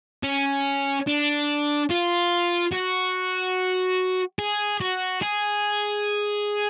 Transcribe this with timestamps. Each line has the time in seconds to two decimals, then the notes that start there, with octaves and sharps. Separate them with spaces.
0.23 C#4
1.07 D4
1.90 F4
2.73 F#4
4.39 G#4
4.80 F#4
5.22 G#4